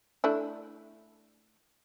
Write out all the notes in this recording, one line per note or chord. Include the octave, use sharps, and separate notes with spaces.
A3 D4 E4